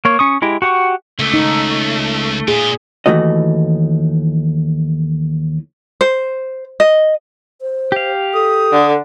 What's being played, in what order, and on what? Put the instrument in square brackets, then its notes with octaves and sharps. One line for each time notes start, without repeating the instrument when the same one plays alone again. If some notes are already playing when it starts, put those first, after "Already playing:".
[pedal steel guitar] A#3 C#5
C#4 C#6 D#6
G#3 E4 G4
F#4 G4 F#5 C#6
[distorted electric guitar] C#2 [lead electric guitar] A3
[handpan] D#4
[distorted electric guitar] A#2 F4 [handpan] G#4
[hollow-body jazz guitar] D#2 D3 E3 A3 F#4 D#5
[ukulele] C5
D#5
[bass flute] C5
[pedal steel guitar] G4 F5
[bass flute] A4 [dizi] D#6
[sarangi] D3